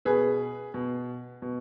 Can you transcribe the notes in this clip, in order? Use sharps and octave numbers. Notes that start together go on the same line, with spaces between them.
B2 G#4 B4
B2
B2